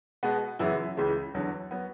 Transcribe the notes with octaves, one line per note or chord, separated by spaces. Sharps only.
B2 G#3 B3 F#4
F#2 C#3 E3 B3 E4
C#2 C#3 E3 G#3
E2 D3 F#3
F#3 B3